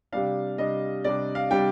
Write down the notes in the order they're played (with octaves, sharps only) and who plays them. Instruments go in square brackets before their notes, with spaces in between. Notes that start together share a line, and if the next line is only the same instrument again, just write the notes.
[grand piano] C3 G3 D4 F5
C3 G3 D4 D#5
C3 G3 D4 D5
F5
C3 G3 D4 G5